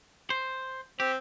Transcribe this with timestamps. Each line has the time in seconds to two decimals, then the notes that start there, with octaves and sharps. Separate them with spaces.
0.30 C5
1.00 C4 G4